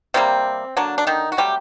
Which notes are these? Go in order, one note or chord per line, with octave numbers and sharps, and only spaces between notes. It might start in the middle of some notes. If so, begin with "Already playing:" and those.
C3 G3 A#3 C4
D3 F#3 A#3 D4
D4
D#3 D#4
F#4
C3 F#3 G3 A3 G4